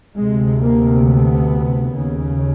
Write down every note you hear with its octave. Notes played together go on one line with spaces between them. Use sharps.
D2 C3 G#3
A#3
B3
D#2 C#3